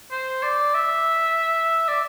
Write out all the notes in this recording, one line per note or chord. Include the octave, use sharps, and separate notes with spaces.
C5
D5
E5
D5